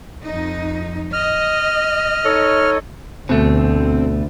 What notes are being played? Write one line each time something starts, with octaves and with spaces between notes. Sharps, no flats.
F2 D#4
D#5 F6
D#4 A4 C#5
D2 B2 A3 C4